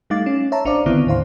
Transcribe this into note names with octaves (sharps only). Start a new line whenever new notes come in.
G3 A3 D#4 F5 D6 A6
C#4
C#5 E5 A5 A#5
G#1 D4 C5 D5 F5 D6
D3 D#3 B3 C4 E4
D#2 A2 C5 F5 C6